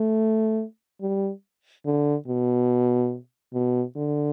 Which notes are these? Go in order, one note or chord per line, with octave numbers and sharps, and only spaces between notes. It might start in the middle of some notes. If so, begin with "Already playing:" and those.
Already playing: A3
G3
D3
B2
B2
D3